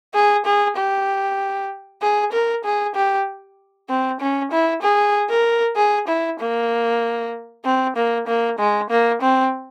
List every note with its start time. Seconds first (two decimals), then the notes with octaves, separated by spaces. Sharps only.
0.14 G#4
0.45 G#4
0.76 G4
2.02 G#4
2.33 A#4
2.65 G#4
2.95 G4
3.89 C4
4.20 C#4
4.51 E4
4.83 G#4
5.30 A#4
5.76 G#4
6.08 E4
6.40 A#3
7.65 C4
7.96 A#3
8.27 A#3
8.59 G#3
8.90 A#3
9.21 C4